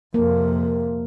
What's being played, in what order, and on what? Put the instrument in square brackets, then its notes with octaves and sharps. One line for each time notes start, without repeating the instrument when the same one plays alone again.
[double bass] F2 C3 [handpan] A#3